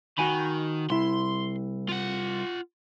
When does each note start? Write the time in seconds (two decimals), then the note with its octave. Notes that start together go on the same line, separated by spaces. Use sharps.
0.18 D#3 F#4 G#5 B5
0.90 C2 E4 C6
1.89 F4 F#5